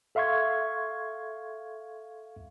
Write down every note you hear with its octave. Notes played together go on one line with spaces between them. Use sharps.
A4 E5 F5 C6 C#6 G#6